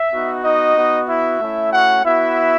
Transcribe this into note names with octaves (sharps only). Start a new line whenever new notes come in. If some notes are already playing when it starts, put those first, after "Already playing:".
Already playing: E5
B3 D#4 F#4
D#4 D#5
B3 F#4
E4 E5
A3 C#4 E4
F#4 F#5
B3 E4 F#4 E5